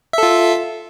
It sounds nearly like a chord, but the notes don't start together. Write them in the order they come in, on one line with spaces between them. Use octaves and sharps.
E5 A4 F4